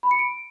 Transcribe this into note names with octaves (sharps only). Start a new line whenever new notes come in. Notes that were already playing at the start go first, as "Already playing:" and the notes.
B5
C#7
D7